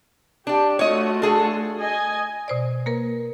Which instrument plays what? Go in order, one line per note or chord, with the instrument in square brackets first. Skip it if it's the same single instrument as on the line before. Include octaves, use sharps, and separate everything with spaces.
[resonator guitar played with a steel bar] D4 D5 [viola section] G4
[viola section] A3 F4 F#4 [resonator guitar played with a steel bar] C#5 D#5
[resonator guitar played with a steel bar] D4 G#4 A4
[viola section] D#5 G#5
[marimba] B2 C5 D5
A#3 A#4 B4